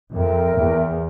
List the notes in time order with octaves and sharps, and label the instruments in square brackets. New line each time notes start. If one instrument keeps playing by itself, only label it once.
[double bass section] F2 [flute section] A#4 E5 G5
[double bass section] E2